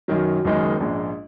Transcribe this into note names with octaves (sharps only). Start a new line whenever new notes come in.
F#2 D#3 F#3
F#1 F#2 D#3 G#3 D#4
A#1 G#2 G#3